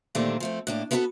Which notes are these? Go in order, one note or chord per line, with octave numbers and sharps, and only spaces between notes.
A#2 D3 D#3 G3 A3 C4
F3 A3 C4
A2 A#3 D4
B3 E4 F#4 G4 A4 B4